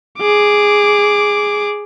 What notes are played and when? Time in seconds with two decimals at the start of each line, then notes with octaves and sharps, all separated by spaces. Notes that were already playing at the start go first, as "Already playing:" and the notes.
0.19 G#4 D6